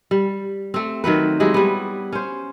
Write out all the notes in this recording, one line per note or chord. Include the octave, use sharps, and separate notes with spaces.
G3
A3 C4
D#3 F#3 C4 B4
F#3 G#3 E4 G4
G3 B3
C#4 C5